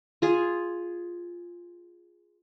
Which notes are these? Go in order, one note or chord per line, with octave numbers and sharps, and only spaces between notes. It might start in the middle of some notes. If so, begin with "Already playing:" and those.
F4 G#4